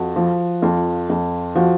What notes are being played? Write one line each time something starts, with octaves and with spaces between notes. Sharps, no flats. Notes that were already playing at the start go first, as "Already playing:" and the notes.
Already playing: F2 F#4
F3
F2 F4
F2
F3 F#4